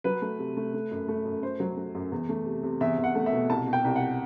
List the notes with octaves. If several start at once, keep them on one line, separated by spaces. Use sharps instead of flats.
F#3 B4
A3
C3
A3
A3
F#2
A3
F#2
A3 C5
F#3
A3
F#2
E2
A3
C3
C3
E2 E5
E2
F#5
A3
E5
B2
C2 A5
B2
G5
C2
F#5